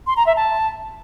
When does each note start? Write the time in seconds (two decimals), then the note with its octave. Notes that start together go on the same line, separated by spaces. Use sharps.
0.07 C6
0.17 A#5
0.26 E5
0.36 A5